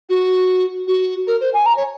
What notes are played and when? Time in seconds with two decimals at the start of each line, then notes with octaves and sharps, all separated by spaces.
0.09 F#4
0.87 F#4
1.27 A#4
1.41 C5
1.54 G#5
1.66 A#5
1.77 C#5